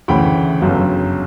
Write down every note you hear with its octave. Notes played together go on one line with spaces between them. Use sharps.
D2 C#3 E3 G5 B5
G1 F#2 C#3 F#3